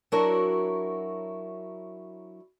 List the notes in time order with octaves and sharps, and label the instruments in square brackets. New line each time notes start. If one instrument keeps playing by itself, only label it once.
[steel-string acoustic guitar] F#3 D4 E4 F#4 A#4 C#5